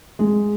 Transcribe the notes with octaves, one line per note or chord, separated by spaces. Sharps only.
G#3